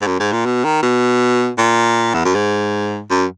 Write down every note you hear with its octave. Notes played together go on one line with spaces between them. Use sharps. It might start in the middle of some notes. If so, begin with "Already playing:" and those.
G#2
F#2
G#2
A#2
B2
D#3
B2
A#2
E2
F#2
G#2
F#2